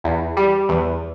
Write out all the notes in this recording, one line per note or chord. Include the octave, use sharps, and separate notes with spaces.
E2
G3
E2